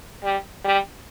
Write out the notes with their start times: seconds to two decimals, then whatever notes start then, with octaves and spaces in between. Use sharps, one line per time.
0.23 G3
0.65 G3